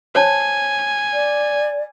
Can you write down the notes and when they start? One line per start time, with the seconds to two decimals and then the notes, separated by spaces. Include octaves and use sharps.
0.15 C5 C#5 G#5 A5
1.13 D5